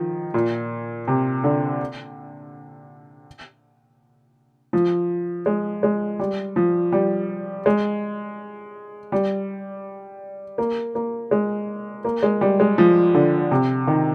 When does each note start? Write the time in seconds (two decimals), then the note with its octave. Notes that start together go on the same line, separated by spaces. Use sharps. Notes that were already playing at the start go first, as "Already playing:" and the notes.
Already playing: D#3 F3
0.34 A#2
1.08 C3
1.44 D3
4.73 F3
5.46 G#3
5.83 G#3
6.19 G3
6.56 F3
6.92 G3
7.66 G#3
9.12 G3
10.58 A#3
10.95 A#3
11.31 G#3
12.05 A#3
12.23 G#3
12.41 G3
12.60 G#3
12.78 F3
13.14 D3
13.51 C3
13.87 D#3